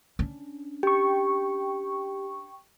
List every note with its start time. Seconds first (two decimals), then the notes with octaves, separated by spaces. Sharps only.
0.19 C#4 D4
0.83 G4 G5 C#6